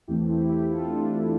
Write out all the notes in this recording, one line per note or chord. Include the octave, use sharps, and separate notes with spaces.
E2 E3 A3 C4 E4 G4
E4 G4
E4 G4
F4 A4
D4 F4
E4